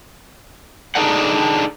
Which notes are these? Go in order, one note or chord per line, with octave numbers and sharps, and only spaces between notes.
D4 D#4 G#4 A4 D5 F#5